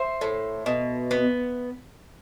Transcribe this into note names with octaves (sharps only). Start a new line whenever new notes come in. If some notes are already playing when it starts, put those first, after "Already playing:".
Already playing: C5 E5
A2
B2
B3